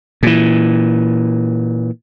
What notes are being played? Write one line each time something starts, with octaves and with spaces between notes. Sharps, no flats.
A#2 E3